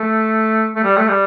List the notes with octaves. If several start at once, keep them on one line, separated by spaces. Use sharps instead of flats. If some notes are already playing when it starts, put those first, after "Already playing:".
Already playing: A3
A3
G3
A3
G3